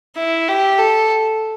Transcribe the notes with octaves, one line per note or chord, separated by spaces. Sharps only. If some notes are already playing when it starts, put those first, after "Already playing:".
E4
G4
A4